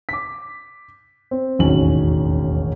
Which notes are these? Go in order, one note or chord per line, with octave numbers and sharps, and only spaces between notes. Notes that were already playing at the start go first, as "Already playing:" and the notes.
D6 B6
C4
E1 A1 D#2 C#4 F#4 F#7